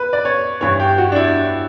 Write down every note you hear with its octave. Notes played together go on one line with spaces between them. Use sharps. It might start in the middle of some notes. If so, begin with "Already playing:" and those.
Already playing: B4
D5
C#5
G2 E3 C#5
G4
F#4
D4
E4